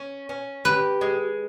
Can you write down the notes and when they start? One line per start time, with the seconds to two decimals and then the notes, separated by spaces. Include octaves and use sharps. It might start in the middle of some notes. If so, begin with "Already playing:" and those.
Already playing: C#4
0.29 C#4
0.65 G4 B4
1.01 G#3